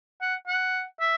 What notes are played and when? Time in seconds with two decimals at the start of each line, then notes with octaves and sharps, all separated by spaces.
0.22 F#5
0.47 F#5
1.00 E5